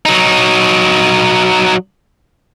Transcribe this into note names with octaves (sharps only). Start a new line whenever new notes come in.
F#3 D#4